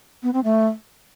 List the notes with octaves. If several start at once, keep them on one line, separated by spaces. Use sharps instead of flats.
B3
C4
A3